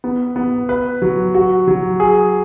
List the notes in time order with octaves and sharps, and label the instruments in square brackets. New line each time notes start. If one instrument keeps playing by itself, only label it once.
[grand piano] B3
B3
B4
F#3
F#4
F#3
G#4